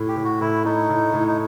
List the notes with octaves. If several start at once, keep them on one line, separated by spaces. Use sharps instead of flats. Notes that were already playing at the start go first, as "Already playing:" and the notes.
Already playing: A2
G4
A2
F#4
A2 E4
A3 D#4
A2
A2
D#4